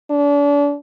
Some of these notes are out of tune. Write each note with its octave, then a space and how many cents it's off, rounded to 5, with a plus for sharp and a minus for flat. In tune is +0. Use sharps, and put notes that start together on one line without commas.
D4 -35